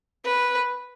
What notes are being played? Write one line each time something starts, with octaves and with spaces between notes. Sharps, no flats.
B4